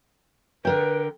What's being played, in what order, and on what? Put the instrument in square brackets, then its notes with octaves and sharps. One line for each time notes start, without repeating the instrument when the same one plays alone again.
[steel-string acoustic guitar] D3 A#4 G5 [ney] B4